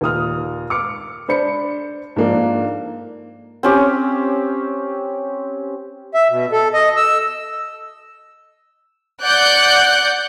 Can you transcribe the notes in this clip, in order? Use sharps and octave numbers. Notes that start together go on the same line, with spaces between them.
D#2 A#2 D#6 F6
D6 F6 C#7
D4 C5 B5 C#7
G#2 F3 A#3 D4
C4 C#4 G4
E5
B2
A4
D#5
E6
D5 F#5 F#6 G6